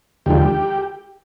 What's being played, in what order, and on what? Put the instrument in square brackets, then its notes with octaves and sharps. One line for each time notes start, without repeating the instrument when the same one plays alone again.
[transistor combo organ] D#2 D3 F3 G#3 G4